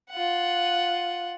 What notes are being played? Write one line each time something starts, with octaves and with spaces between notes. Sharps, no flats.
F4 F#5